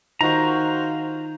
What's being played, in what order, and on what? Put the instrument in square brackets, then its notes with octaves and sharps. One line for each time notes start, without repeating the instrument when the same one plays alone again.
[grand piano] D#3 [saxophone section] F4 F#4 C5 [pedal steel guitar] A#5